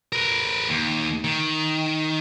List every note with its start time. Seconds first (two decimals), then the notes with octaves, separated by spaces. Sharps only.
0.12 A#4 B4
0.69 D#2
1.24 D#3